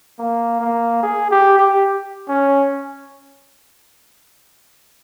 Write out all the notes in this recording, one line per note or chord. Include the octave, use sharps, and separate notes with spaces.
A#3
A#3
G#4
G4
G4
C#4